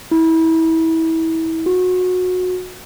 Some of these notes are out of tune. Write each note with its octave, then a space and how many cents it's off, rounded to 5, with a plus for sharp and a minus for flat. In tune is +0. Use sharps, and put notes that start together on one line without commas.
E4 -25
F#4 -20